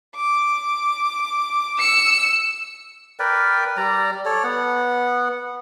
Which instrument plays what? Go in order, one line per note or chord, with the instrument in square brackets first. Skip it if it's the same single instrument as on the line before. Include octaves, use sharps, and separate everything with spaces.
[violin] D6
E6 C#7
[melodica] A#4 B4 D5 G5
G3 D5 A#5
A4 C#5 D5
B3 F#5